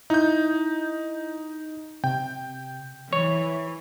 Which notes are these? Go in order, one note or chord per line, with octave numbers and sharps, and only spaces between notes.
D#4 E4 G6
C3 G5
E3 C#5